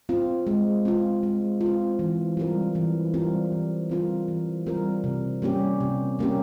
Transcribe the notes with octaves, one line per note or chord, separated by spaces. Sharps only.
C4 F4
G#3
C4 F4
G#3
F4
C4
E3
G3 C4 F4 A#4
E3
G3 C4 F4 A#4
E3
G3 C4 F4 A#4
E3
G3 C4 F4 A#4
C3
G3 A#3 C#4 G4
C3
G3 A#3 C#4 G4